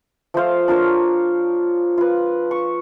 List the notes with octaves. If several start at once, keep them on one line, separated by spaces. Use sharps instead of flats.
F3 A3 C5 F5
D4 F4 A#4 C#5
F4 B4
C#6